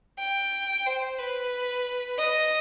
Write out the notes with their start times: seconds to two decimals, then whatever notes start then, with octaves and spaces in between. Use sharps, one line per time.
0.19 G5
0.86 C5
1.19 B4
2.19 D#5